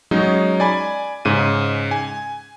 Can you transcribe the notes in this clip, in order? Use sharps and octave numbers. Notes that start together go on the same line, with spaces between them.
F#3 G#3 C#4 D#4
D5 G#5 B5
G#2 C#3 D#7
G#5